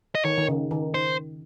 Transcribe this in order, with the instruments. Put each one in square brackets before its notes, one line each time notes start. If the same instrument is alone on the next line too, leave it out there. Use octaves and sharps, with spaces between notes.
[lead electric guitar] D#5
[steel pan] D#3 [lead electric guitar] C#5
[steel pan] D#3
C#3
D#3
[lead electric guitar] C5